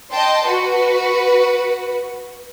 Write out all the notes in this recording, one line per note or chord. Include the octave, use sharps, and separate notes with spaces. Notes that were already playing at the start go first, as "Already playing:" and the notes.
D#5 G5 A5 C6
F#4 B4